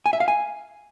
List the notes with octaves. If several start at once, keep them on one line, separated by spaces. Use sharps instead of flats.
G#5
E5
F5
G#5